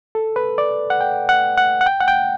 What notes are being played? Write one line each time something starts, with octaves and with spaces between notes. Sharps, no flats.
A4
B4
D5
F#5
G5
F#5
F#5
F#5
G5
F#5
G5